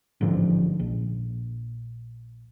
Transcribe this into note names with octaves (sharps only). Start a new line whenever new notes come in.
A1 G#2 D3 F3
A#1